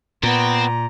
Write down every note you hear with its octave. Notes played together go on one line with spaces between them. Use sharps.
A#2 B3 C4 A#5